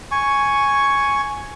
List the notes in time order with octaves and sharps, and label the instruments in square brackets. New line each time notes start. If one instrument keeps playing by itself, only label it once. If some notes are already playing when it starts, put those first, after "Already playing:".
[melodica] G#5 C#6